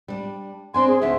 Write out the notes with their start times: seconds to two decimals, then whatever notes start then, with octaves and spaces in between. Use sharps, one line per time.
0.08 G3 D4
0.74 C4 D4 G#5 C6
0.88 G#4
1.02 D2 A2 D3 E5